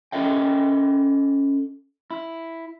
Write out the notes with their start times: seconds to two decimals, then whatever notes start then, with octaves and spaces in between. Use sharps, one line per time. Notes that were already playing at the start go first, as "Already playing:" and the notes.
0.12 C#4 A4 D#5 E5 G5
2.11 E4